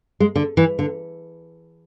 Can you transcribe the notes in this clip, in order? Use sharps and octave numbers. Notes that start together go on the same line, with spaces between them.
G#3
D3
E3
D3